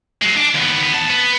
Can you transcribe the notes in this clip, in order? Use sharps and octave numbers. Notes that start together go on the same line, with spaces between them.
F#3 G#3
D4
D#2 B3
E2 A5
B3